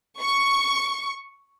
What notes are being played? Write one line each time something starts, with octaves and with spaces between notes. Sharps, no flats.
C#6